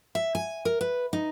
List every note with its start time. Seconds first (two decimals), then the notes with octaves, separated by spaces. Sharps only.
0.15 E5
0.35 G#5
0.65 A#4
0.81 B4
1.13 D#4